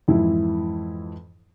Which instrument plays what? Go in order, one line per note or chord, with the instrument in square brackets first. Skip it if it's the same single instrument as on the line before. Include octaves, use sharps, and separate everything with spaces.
[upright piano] F2 G#2 E3 E4